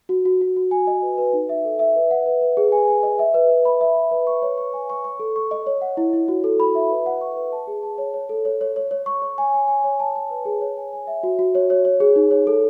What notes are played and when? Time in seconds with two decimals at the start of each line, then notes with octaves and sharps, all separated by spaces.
0.09 F#4
0.25 F#4
0.41 F#4
0.56 F#4
0.71 G#5
0.87 D#5
1.02 B4
1.18 B4
1.33 D#4
1.49 E5
1.65 A4
1.79 E5
1.96 B4
2.11 F#5
2.26 B4
2.41 B4
2.57 G#4
2.72 G#5
2.88 G#5
3.03 D#5
3.19 E5
3.34 B4
3.51 B4
3.65 B5
3.81 E5
3.96 E5
4.11 B4
4.27 C#6
4.42 C#5
4.58 C#6
4.74 G#5
4.90 C#6
5.04 C#6
5.20 A4
5.36 C#6
5.51 D#5
5.67 C#5
5.82 F#5
5.97 E4
6.13 E4
6.28 F#4
6.44 A4
6.60 B5
6.75 E5
6.90 B4
7.06 F#5
7.21 C#6
7.36 B4
7.52 A5
7.67 G#4
7.83 A5
7.98 C#5
8.14 C#5
8.29 A4
8.45 C#5
8.61 C#5
8.76 C#5
8.91 C#5
9.06 C#6
9.22 C#5
9.38 G#5
9.54 G#5
9.68 G#5
9.84 C#5
10.00 A5
10.16 A5
10.30 B4
10.45 G#4
10.61 C#5
10.77 G#5
10.93 G#5
11.07 E5
11.23 F#4
11.39 F#4
11.55 C#5
11.70 C#5
11.85 C#5
12.00 G#4
12.16 D#4
12.31 C#5
12.47 A4